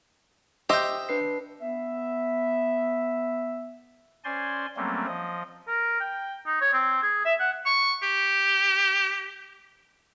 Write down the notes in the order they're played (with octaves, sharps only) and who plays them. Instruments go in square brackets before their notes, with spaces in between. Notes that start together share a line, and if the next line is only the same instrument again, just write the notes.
[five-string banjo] G4 C5 D#5 [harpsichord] E5 G5
[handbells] D4 B4 C7
[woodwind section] B3 E5
[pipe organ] C#4 C5 D5 G#5 C6
F#3 G3 A3 A#3 C4 C#4
F3 D#5
[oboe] A#4
G5
D#4
C#5
C4
G#4
E5
F#5
[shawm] C#6
G4